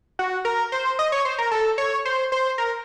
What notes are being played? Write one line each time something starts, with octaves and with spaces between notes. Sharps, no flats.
F#4
A#4
C5
D#5
C#5
C5
A#4
A4
C#5
C5
C5
A#4